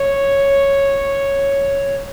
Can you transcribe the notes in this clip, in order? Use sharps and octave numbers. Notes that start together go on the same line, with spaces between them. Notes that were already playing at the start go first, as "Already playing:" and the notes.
Already playing: C#5